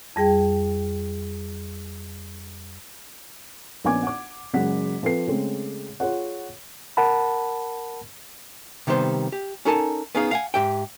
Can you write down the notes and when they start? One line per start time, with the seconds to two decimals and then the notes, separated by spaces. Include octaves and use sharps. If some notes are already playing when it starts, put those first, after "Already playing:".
0.16 F2 G3 G#4 G5
3.84 A#1 B3 C#4 G#5 D6 G#6
4.03 F#5 D6
4.53 F#1 F#2 G#3 F#5 B6
5.03 F3 C4 A4 B4 C7
5.27 C#3 G#3 A3 C4
6.00 F4 G#4 C#5 F#5
6.97 A#4 F#5 A5 B5
8.87 C3 D#3 G3 B3 C5
9.32 G4
9.65 C#4 D#4 A4 A#4 G#5 A5
10.15 B3 C#4 D#4 G#4 F5
10.31 F5 F#5 G#5
10.54 G#2 G4 E5 G5